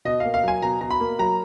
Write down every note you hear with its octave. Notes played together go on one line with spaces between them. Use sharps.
B2 D#5
F5
A#3
F5
F#3 G#5
B2 A#5
B2 A#5
B5
A#3
F#3 A#5